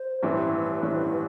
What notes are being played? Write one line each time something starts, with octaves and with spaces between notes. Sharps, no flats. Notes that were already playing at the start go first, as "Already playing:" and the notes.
Already playing: C5
A1 G2 E3 G3 C4 B4
A1 G2 E3 G3 C4